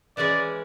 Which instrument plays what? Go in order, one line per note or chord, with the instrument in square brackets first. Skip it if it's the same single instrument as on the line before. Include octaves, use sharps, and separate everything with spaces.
[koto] E3 G#3 C#4 G#4 [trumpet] D5